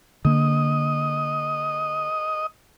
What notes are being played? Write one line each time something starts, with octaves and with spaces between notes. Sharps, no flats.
D3 A#3 D#5